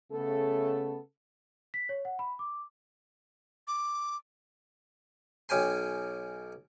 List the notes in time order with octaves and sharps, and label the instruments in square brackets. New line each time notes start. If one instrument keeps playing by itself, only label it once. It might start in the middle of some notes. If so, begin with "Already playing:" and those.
[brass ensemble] C#3 A3 B3 A4
[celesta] B6
C#5
F#5
B5
D6
[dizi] D6
[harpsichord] B1 C#4 G5 G#5 C6